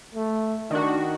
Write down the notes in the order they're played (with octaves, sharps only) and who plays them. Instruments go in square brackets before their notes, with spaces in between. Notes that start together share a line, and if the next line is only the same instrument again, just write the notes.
[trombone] A3
[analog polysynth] D#3 F#4 [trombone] D4